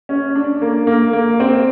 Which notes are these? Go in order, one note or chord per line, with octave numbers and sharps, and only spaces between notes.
C#4
D4
A#3
A#3
A#3
C4